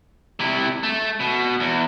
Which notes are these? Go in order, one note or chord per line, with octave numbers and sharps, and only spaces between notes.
C3 E4
A3
B2
E2